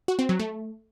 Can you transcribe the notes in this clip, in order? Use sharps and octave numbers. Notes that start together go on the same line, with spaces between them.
F#4
C4
F#3
A3